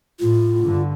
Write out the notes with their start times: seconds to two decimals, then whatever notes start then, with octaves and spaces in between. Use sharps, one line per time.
0.20 A2 F4
0.61 G2 D3